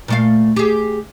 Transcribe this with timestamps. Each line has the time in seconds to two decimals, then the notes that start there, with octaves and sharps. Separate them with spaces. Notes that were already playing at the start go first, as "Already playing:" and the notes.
0.08 A#2 A3 F5
0.56 G4 G#4